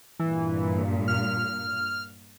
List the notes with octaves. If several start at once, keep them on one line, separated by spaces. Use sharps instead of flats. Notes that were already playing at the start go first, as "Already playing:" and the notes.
G2 A#2 E3
F6